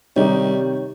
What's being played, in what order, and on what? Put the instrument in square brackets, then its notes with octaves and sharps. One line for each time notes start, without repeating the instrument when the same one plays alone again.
[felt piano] C3 D#3 G4 [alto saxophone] G3 [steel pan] D#4 [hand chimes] C#5